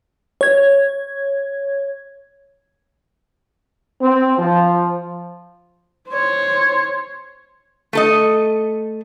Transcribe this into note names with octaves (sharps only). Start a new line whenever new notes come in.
C#5 G#6
C4
F3
C5 C#5
A3 A4 D#5